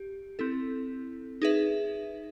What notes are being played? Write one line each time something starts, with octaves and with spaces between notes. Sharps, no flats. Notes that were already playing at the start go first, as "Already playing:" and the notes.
Already playing: G4
C4 E4 A4
D#4 G#4 B4 E5